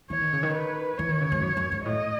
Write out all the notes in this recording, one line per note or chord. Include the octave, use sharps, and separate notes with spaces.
E3 C#5
D#3
C#3
D#3
B4
E3 C#5
D#3
C#3
G#2
F#2
F#2
G#2
A2 D#5